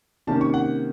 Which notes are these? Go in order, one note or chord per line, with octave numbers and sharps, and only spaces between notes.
C3 D#3 A#3 C#4 A5
C#6
F#5